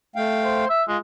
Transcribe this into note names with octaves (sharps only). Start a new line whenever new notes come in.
A3 F5 G5
C5
E5
G#3 F4